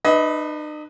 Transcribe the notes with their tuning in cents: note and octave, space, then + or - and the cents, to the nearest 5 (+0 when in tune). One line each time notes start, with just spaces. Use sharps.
D#4 -45 B4 +0 D#5 +30